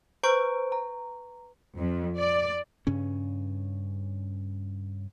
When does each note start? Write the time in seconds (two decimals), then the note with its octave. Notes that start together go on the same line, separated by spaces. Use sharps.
0.23 B4 C5 A#5 C#6 G6 D7
0.72 A#5
1.77 F2
2.17 D5
2.87 G2 C#3 C#4